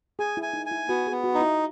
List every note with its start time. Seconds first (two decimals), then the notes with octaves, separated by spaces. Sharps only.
0.19 G#4 G#5
0.37 E4
0.43 G#5
0.53 D#4
0.66 G#5
0.71 E4
0.88 B3 F#4
1.07 B3 G#4
1.24 F#4
1.34 D#4
1.41 E4